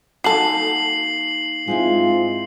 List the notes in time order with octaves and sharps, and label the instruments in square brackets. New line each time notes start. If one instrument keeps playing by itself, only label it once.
[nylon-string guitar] A#3 D#4 G#5 [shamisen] F#4 A4 [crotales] C7 F#7
[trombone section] G#2 F4 [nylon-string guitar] G#3 C4 E4